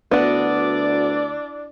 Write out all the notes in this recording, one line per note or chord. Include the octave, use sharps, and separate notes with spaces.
D2 B3 D4 E4 F#4 D5